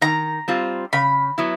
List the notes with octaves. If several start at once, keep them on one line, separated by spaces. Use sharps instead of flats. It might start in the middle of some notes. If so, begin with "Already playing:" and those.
D#3 A#5
G3 C4 F4
C#3 B5
F#3 B3 E4